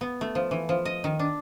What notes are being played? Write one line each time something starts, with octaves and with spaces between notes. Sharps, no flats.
B3
A3
F3
E3
F3
D#5
D#3
D4